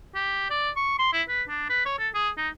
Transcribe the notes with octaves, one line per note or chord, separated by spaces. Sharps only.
G4
D5
C#6
C6
E4
B4
D4
B4
C#5
A4
G#4
D#4